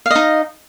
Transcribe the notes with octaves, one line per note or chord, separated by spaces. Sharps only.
D#4 D#5 F5